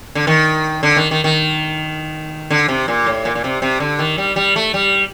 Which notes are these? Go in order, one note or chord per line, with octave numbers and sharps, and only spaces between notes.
D3
D#3
D3
D#3
D#3
D#3
D3
C3
A#2
A2
A#2
A#2
C3
C3
D3
D#3
G3
G3
A3
G3